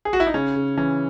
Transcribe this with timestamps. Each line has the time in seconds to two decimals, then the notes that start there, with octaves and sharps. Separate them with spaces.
0.05 G#4
0.13 F#4
0.20 E4
0.27 D#4
0.34 C#3 C#4
0.56 C#3
0.77 E3 C#4